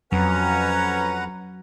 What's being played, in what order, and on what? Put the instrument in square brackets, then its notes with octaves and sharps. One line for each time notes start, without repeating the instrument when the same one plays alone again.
[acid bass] F2 [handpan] F#3 [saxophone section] C#4 [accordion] B4 F#5 A#5